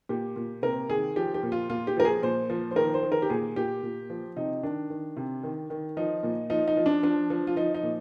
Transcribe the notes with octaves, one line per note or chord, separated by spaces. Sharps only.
A#2 G4
A#2
C3 A#4
D#3 G#4
F3 G4
G4
A#2
F4
A#2 F4
G4
F3 A#4
G#4
A#2 C5
F3
C5
D#3 A#4
C5
D#3
A#4
G4
A#2 G#4
A#2 G4
A#2
F3
C3 D#4
D#3 D4
D#3
C3
D#3
D#3
F3 D#4
A#2
F3 D#4
D#4
F3
D4
F3 D4
F3
F4
F3 D#4
D#4
A#2